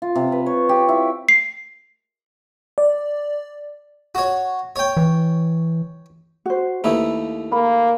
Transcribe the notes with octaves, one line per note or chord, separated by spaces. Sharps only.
F4
C3
B4
C#5
G4
E4
C7
D5
F#4 C#5
C#5 G5
E3
F#4 C5
D#2 A3 D#4 E4 B4
A#3 B5